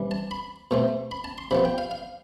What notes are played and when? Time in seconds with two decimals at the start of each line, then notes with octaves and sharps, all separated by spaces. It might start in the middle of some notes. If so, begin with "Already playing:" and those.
Already playing: C3 E3 G3 D4
0.11 A5
0.31 B5
0.71 B2 A3 C4
1.11 B5
1.24 A5
1.38 C6
1.51 C3 F3 B3 B5
1.65 G5
1.78 F5
1.91 F5